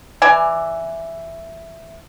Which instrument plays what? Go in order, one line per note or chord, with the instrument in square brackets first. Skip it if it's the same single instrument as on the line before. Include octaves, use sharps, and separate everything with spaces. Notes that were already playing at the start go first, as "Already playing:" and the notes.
[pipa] E3 D5 G#5